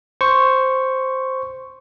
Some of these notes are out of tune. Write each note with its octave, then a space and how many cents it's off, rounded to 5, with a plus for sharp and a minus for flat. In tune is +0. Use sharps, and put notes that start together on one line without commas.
C5 +0 C#6 +0